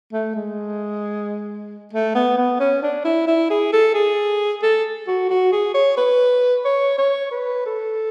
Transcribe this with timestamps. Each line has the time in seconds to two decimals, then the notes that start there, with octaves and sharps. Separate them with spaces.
0.13 A3
0.35 G#3
1.93 A3
2.15 B3
2.37 B3
2.60 C#4
2.82 D4
3.05 E4
3.27 E4
3.50 G#4
3.73 A4
3.94 G#4
4.62 A4
5.07 F#4
5.29 F#4
5.52 G#4
5.74 C#5
5.97 B4
6.65 C#5
6.98 C#5
7.31 B4
7.66 A4